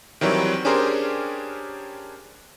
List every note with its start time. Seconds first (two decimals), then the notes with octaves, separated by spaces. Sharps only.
0.21 D#3 E3 F#3 G3 C4
0.65 C#4 D4 G4 G#4 A#4 C5